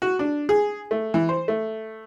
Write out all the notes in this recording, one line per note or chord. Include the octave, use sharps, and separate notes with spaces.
F#4
D4
G#4
A3
E3
C5
A3